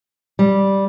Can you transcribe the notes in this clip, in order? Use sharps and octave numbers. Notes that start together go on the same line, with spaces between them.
G3